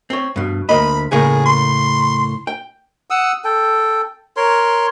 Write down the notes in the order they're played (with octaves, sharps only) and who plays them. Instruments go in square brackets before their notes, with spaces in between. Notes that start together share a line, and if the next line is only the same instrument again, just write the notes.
[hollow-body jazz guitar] C4 C#5
G2 B2
[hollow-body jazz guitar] D2 A#3 D#5 [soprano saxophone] B5
[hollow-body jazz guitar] A2 C#3 A#3 [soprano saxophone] G#4
[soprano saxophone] C6
[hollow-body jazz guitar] G5
[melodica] F#5 D#6 E6
A4 G5
A#4 C#5 C6